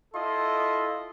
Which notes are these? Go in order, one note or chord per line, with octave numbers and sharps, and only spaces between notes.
E4 F4 A4 D#5 C6